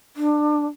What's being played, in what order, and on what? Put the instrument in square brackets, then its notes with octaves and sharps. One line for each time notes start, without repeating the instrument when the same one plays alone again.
[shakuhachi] D4